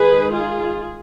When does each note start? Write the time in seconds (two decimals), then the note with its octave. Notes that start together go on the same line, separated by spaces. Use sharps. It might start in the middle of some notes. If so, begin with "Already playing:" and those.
Already playing: D#3 G#3 D#4 G#4 B4
0.33 F4 G#4